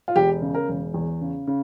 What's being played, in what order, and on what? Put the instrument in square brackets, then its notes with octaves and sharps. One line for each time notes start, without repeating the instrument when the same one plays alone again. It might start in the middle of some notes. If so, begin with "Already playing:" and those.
[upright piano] F4
E1 G4
C#3
A#4
E1
E2
C#3
C#3